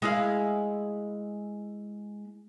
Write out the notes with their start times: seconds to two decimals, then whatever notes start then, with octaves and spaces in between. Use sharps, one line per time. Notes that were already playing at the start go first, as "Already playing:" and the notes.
0.02 G#3 E4 F5